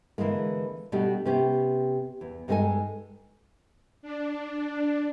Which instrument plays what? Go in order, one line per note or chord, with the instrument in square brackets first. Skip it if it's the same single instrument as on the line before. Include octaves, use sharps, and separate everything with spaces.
[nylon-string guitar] D3 E3 F#3 G#3 A#3
B2 G3 A3 D4 D#4 G4
C3 B3 C#4 G4
E2
G2 G#3 A#3 D#4 A4 G#5
[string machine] D4